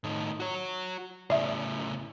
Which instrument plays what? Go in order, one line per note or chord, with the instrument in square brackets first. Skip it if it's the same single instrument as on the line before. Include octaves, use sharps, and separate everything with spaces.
[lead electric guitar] A2 D#3
F#4 C#5
[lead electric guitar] A2 C#3 [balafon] D5 E5